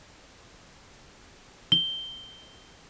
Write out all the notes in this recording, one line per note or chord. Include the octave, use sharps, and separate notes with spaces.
G7